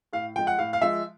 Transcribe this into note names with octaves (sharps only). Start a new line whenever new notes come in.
A2 F5
F3 G#3 G5
F#5
A2 F5
F5
F3 G#3 E5